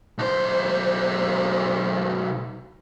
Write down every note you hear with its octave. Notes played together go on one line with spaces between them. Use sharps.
B1 C5